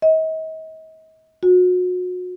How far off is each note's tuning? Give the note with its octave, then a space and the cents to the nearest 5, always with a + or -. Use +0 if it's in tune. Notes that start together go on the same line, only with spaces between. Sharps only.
D#5 +40
F#4 -35